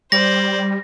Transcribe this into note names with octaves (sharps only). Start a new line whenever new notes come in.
G3 C5 D5 A#6